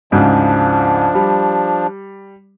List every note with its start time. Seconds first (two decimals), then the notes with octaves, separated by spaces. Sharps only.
0.12 D2 G#2 C#3 F3 D4
1.14 G3